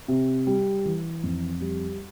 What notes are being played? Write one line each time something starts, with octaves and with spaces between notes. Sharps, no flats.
C3
G3
E3
F2
G3